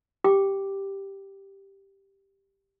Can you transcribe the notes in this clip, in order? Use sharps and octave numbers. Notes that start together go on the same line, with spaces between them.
G4 G5 D6